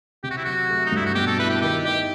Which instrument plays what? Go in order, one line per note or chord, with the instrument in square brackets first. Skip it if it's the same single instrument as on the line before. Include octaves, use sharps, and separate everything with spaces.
[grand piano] C3 [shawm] G4
[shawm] F#4
E4
[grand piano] F#3 [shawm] F#4
[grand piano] A3
[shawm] D#4
[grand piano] G2 [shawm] E4
[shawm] F#4
[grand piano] B2 [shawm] G4
[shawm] A4
[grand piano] E4 [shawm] B4
[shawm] G4
[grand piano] D#3 [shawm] G4
[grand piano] D#4 [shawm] G4